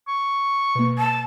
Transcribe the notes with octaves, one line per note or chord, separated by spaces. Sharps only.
C#6
B2 A#3
A5